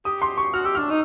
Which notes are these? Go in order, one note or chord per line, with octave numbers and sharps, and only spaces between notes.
G4 D#6
C6
C#6
F#4 F6
G4 E6
D4 F6
D#4